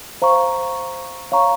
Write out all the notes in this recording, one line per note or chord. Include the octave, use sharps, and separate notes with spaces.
C5 F5 A#5 C#6
C#5 F5 A#5 C#6